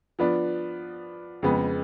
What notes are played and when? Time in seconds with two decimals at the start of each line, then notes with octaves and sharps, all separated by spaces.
0.19 F3 B3 D4
1.43 F2 C#3 G#3 B3